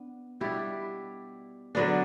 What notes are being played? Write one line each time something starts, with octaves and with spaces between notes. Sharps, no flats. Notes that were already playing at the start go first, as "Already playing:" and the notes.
Already playing: B3 D4
B2 G3 D4 E4 G4
D3 F#3 B3 D4